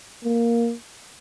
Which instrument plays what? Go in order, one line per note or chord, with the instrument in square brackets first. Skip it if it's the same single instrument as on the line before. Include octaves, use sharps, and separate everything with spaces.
[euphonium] A#3